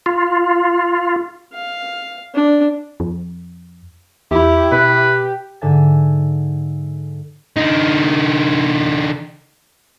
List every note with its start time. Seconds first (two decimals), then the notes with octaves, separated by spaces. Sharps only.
0.06 F4
1.53 F5
2.34 D4
3.00 F2
4.31 E2 E4 G4
4.72 B2 B4
5.61 G#2 D3 E5 G#5 A6
7.57 D3 D#4